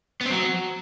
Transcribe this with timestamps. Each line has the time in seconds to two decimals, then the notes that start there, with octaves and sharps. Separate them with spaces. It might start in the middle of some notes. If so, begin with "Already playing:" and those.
0.21 B3
0.26 C4
0.31 F#3